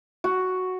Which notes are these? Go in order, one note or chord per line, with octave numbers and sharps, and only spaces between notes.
F#4